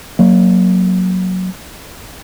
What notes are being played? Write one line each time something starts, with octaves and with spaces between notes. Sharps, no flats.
F#3 A#3